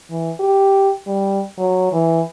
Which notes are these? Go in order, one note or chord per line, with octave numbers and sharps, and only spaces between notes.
E3
G4
G3
F#3
E3